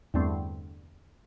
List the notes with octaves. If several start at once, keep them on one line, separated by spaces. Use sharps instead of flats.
E2 G2 D3 G3 A3 C4